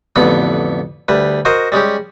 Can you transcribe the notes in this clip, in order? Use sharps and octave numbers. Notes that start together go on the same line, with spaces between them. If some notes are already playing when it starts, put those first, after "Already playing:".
A1 F2 D3 B3 B5
D2 G3 B4
F#4 A#4 C5 D#5
G3 G#3 C#4 G4